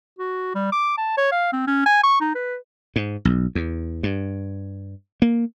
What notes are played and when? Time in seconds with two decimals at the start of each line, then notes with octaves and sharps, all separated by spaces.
0.19 F#4
0.55 G3
0.72 D6
0.98 A5
1.17 C#5
1.32 F5
1.53 C4
1.67 C#4
1.86 G#5
2.03 C#6
2.21 D#4
2.35 B4
2.96 G#2
3.25 B1
3.55 E2
4.03 G2
5.22 A#3